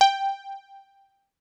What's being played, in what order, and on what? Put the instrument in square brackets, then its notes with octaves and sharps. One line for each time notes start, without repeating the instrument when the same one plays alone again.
[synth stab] G5